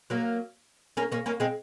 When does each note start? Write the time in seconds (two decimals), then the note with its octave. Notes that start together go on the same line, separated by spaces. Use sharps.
0.10 F#3 A#3
0.97 A#3 C#4
1.12 A#3 C#4
1.26 A#3 C#4
1.40 G#3 C4